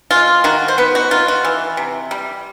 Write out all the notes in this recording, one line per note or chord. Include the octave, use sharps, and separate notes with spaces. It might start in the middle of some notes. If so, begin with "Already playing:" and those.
G#3 F4
D#3 F#4
C5
B3 B4
F#4
D#3 F4
F#4
E3
C3
G3